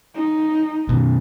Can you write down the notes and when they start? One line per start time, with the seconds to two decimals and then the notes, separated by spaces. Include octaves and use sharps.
0.14 D#4
0.89 B2 D#3